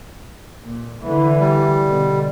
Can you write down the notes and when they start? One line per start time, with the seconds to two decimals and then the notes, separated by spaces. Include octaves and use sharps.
0.64 A#2
1.02 D3 E3
1.40 G3
1.85 B2 D3